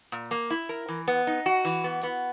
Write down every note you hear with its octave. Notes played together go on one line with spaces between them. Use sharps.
A#2
A#3
E4
A#4
E3
B3
D#4
F#4
E3
B3
B3